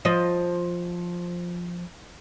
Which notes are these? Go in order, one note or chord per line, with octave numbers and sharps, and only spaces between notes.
F3 D#5